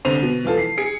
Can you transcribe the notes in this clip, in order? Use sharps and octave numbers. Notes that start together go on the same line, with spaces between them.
C2 D3 C5 D#7 F7
B2
E3 F3 F4 A4
C7
G#4 C#7